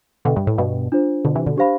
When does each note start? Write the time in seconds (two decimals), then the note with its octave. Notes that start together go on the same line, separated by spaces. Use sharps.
0.25 B2 D3 B4 E5 G5
0.36 G2
0.47 A2
0.58 G2 B2
0.92 D4 F4 C5
1.25 B2 D3
1.35 C3 E3
1.46 B2 D3
1.57 D4 G4 C5 F5 B5